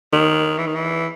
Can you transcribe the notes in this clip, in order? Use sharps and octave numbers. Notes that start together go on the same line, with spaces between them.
D#3
E3
D#3
E3